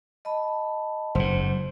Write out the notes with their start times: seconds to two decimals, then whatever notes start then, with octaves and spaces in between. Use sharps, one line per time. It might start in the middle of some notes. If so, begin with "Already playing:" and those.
0.25 D#5 A5 B5
1.15 F#1 G#2 F#3 C5